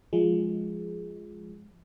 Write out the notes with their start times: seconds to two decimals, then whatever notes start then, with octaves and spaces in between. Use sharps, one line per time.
0.13 F3 G#3